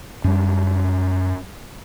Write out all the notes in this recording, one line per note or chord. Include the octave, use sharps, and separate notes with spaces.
F#2 G3